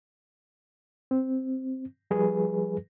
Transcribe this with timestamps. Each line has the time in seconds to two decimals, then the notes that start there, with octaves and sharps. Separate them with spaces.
1.11 C4
2.11 F3 G3 G#4 B4